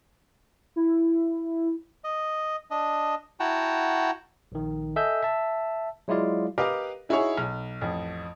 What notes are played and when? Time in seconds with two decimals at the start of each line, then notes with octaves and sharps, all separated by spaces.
0.76 E4
2.04 D#5
2.71 D4 D#5
3.40 E4 F#4 F#5 G5 A5 A#5
4.52 A#1 D#3
4.96 A4 D#5 E5 G#5 E6 G6
5.22 E5 A5
6.08 F#3 G#3 E4 F4 D5 F5
6.58 G4 A#4 B4 D#5 F5 D6
7.09 D#4 E4 F#4 G#4 C#5
7.37 B1
7.81 A1 F2